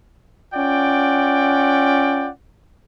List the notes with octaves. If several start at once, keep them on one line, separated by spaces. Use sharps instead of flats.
C#4 F4 D5 F#5 G5